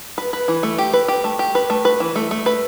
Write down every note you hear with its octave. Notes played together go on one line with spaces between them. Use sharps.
B4
B4
E3
A3
G4
B4
G4
A3
G4
B4
A3
B4
E3
A3
A3
B4